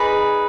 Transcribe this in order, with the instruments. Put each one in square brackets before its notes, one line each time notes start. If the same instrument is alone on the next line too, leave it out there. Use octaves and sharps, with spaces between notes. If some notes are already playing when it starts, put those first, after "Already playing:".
Already playing: [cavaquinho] D#4 G#4 B4 D5